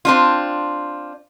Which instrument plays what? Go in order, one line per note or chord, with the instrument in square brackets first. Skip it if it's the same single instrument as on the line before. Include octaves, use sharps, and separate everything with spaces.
[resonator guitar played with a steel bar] C4 D4 F4